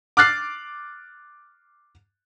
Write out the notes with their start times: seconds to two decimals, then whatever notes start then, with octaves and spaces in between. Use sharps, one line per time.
0.17 D6 F6 F#6 A6 C7